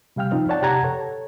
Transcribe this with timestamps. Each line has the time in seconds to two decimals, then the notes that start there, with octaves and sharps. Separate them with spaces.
0.16 C3 G3 F5 G5 F6
0.31 F3 C4 D#4 F4
0.49 C#5 D5 F#5 G5 A5
0.62 C3 G4 F#5 A5 A#5 G#6
0.84 A4 C#5